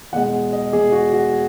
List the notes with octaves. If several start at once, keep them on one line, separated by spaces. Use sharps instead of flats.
E2 B2 G#3 F#5
D#5
E2 B2 G#3 G#4
F#4
F#4